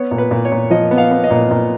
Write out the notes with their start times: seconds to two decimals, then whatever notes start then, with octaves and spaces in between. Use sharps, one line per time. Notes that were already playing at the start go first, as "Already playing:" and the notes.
Already playing: B3 C#5
0.11 A#2
0.18 B4
0.31 A#2
0.45 C#5
0.52 A#2
0.70 F3 D#5
0.91 B3
0.98 F5
1.11 B3
1.24 D#5
1.30 A#2
1.51 A#2